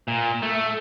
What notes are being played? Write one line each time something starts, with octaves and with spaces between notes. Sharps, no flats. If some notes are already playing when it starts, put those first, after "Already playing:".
A#2
A3